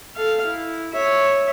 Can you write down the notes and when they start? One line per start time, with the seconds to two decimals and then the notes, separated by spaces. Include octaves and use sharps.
0.16 A4 F5
0.45 E4
0.93 C#5 E5